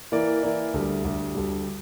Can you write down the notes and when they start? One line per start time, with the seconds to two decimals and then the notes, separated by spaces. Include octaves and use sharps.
0.12 E3 A#3 E4 A#4 D5
0.43 E3 A#3 E4 A#4 D5
0.74 D2 D3 G3
1.04 D2 D3 G3
1.35 D2 D3 G3